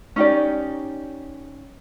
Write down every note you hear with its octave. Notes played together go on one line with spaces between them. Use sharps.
C#4 D#4 G4 D5